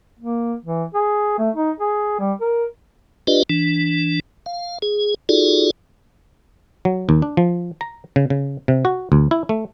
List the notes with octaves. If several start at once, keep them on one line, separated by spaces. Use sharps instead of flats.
A#3
E3
G#4
A3
D#4
G#4
G3
A#4
D4 F4 G4 B4 D5 D#5
E3 D4
F5
G#4
D#4 F4 F#4 G#4 A4 D5
F#3
D#2
D4
F3
A#5
C#3
C#3
C3
F#4
D2
E4
A3